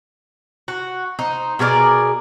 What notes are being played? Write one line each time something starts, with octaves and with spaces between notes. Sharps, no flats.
F#4
D#4 C5
B2 G#4 A#4 D5